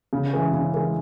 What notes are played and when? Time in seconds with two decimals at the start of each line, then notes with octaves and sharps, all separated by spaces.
0.13 C#3
0.33 E3 G#3
0.53 C#3
0.74 E3 G#3